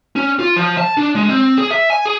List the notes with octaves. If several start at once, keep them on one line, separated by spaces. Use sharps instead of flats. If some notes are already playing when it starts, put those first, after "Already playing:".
C#4
F4
F3
A5
D4
G#3
C4
G#4
E5
G#5
G#4